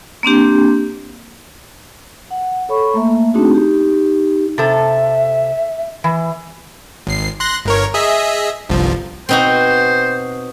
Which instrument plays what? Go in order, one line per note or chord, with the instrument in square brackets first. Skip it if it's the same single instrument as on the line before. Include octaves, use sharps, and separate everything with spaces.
[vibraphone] A#3 C4 D4 G4
F#5
A4 C#5 B5 C#6
A3 A#3 E5
A3 C4 D4 D#4 F#4 G#4
D#4 G4
[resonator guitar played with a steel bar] C3 A4 [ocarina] E5
[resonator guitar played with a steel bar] E3
[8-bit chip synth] G#1 C7
C6 F#6 A#6
G1 A#4 C#5
G#4 D#5 E5
G1 C2 F3
[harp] B2 F#5 B5 [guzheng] C4 D#4 F#4 [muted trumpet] C5